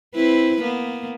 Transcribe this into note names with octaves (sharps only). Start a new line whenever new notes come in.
C4 E4 B4
A#3 B3